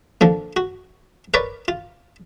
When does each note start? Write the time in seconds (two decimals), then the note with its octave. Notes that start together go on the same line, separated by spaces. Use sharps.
0.21 D3 F3 A#3
0.56 F#4
1.34 A#4 B4 C#5 D5
1.68 F4